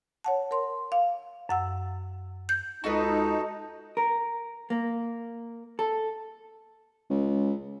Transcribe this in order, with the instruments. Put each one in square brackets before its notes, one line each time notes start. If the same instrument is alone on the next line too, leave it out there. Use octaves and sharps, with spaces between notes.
[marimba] C#5 F#5 A5
A#4 C#5 C6
F5
F#2 F#5 E6
G6
[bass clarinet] C#2 [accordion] D#4 [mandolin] F#4 A4 B4
[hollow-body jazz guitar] A#4
A#3
A4
[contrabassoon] C#2